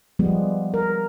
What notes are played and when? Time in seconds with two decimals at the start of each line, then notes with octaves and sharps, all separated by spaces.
0.19 F3 G3 G#3 B3
0.74 A#4